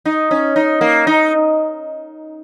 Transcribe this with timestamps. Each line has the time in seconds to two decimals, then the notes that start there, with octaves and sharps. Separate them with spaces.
0.05 D#4
0.31 C#4
0.56 D#4
0.81 A#3
1.07 D#4